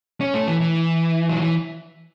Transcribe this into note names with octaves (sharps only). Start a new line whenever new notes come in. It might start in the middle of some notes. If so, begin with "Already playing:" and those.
C#4
A3
E3
E3
F#3
E3